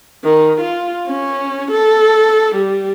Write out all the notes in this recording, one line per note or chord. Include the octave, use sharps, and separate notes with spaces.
D#3
F4
C#4
A4
G3